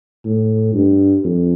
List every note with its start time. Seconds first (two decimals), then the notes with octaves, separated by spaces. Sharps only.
0.25 A2
0.74 G2
1.24 F2